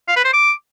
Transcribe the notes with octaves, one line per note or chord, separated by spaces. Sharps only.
F5
B4
C5
D6